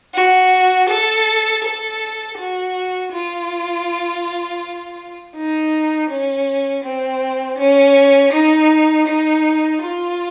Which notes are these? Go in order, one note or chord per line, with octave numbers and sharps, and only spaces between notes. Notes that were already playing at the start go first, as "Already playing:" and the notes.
F#4
A4
A4
F#4
F4
D#4
C#4
C4
C#4
D#4
D#4
F4